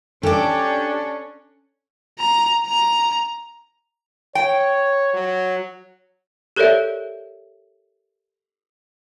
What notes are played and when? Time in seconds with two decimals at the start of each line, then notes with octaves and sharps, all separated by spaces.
0.23 C#4 D4 G4 A4 D5
2.19 A#5
2.67 A#5
4.35 C#5 G5
5.14 F#3
6.56 G4 A4 A#4 C#5 D5 E5